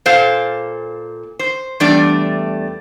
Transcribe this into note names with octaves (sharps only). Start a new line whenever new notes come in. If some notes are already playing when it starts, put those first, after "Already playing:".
A#2 A4 C5 F5
C5
E2 G3 A3 D4 D5